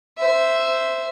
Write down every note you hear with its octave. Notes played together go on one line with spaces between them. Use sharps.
C5 E5